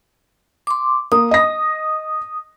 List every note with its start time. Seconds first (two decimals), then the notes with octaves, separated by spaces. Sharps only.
0.67 C6 D6
1.12 A#3 D#6
1.31 D#5 A#6